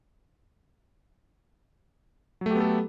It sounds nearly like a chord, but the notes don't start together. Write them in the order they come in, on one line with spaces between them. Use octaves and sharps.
F#3 A3 G4 B3 A4